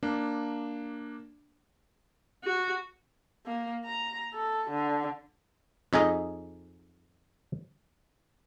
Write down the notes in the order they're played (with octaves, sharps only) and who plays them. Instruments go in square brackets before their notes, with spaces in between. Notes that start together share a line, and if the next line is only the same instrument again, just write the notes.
[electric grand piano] A#3 D4
[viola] F#4
[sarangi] A#3
A#5
A4
D3
[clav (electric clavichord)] F2 D#4 G#4 D#5